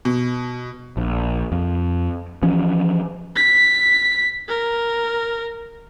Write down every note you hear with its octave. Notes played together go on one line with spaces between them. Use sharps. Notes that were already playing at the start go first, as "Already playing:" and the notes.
B2
A#1
F2
E3 F3 C#4
B6
A#4